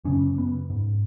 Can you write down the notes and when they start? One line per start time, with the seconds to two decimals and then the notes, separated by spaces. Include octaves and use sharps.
0.05 F#2 C#3 C#4
0.38 B3
0.70 G#2